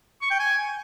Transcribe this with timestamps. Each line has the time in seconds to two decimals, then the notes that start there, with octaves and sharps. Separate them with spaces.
0.22 C#6
0.30 G5
0.39 G#5